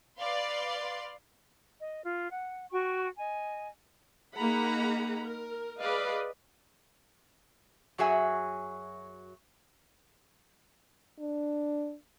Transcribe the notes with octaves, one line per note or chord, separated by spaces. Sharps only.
B4 D5 F5 C6
D#5
F4
F#5
F#4 G5 C#6
D#5 G#5
A#3 D#4 G#4 F#5 A#5 B5
A#4
G#4 B4 D5 D#5 F5
F#2 F#3 F#4 G#4 E5 G#5
D4